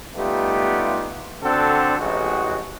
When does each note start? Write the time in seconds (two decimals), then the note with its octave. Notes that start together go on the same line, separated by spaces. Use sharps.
0.15 G3 A3 B3 D#4 F4 G4
1.43 D3 C4 D4 F#4 A4
2.00 A1 G#3 F#4